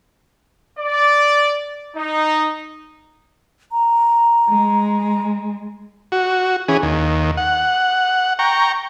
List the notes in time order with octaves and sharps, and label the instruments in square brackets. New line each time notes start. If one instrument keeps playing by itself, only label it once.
[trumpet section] D5
D#4
[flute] A#5
[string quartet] G#3
[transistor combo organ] F#4
E3 C#4 G#4
D#2
F#5
G5 A#5 C#6